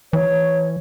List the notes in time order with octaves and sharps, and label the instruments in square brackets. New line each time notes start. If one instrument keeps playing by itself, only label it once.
[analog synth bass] E3 [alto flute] C#5